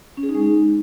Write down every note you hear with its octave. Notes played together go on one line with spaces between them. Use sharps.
C#4
G#4
D#4
G#3
D#4